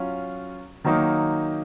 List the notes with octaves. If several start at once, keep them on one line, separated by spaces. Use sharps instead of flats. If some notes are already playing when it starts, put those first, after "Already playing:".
Already playing: F#3 C#4 F4
D#3 F#3 A#3 D#4